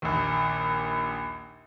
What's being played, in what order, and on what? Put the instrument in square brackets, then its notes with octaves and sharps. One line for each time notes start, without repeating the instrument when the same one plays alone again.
[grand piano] A#1 D#2